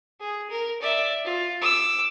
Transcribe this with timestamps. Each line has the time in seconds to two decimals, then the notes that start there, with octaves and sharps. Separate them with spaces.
0.20 G#4
0.50 A#4
0.81 D5 E5
1.25 F4
1.61 D6 E6